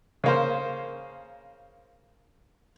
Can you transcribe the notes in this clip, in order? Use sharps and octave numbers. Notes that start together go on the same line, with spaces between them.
C#3 A#3 C5